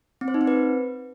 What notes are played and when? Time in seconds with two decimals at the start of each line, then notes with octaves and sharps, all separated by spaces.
0.21 C4
0.28 C5
0.34 D#4
0.41 C4
0.47 B4